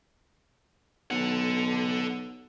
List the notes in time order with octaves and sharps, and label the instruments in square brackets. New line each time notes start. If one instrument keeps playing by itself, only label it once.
[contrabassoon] B1 [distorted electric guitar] A4 F#5